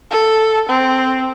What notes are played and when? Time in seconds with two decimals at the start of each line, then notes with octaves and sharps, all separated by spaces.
0.11 A4
0.69 C4